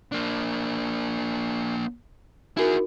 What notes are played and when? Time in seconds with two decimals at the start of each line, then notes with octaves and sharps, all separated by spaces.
0.12 A#3 D4
2.57 D#4 E4 F#4 G#4 A#4